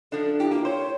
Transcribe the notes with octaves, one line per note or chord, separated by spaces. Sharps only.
F3 D4 A4
E4 G4
A#3 F4
C5 C#5